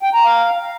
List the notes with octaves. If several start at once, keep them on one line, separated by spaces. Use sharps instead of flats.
G5
A#5
F5